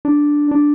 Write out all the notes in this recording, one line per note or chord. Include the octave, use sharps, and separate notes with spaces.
D4
D4